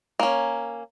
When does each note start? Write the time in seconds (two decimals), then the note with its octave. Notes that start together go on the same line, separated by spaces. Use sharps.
0.19 A#3 C#4